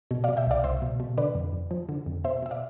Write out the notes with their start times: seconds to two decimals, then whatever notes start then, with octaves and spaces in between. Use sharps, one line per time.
0.11 B2
0.24 D5 F5
0.29 B2
0.37 E5 G5
0.47 C2 D5 F5
0.64 C2 C5 E5
0.82 B2
1.00 B2
1.18 D3 B4 D5
1.35 F2
1.53 F2
1.71 F3
1.89 D3
2.06 F2
2.24 B2 C5 E5
2.42 B2 E5
2.51 D5 F5